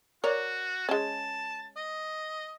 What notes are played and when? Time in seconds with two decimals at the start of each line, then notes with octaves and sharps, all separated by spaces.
0.24 F#4 A#4 C#5 D5
0.89 G#3 C#4 A5
1.77 D#5